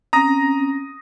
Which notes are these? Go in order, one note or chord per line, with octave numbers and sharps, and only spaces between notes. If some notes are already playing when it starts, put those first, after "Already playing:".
C4 C#4 A#5 D#6 A#6